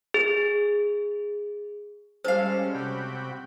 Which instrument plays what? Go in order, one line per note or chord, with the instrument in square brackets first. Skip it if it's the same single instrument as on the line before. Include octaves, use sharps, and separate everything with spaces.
[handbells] G#4
[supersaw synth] G3 G#3 C#4 [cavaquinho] A4 F5 [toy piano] C5
[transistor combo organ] C3 F#4 G5 [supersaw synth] B5